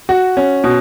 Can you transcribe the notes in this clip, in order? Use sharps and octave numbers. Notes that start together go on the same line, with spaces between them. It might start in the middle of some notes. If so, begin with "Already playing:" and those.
F#4
C#4
B2